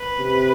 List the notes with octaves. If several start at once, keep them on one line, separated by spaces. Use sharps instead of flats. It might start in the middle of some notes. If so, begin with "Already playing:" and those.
Already playing: B4
C3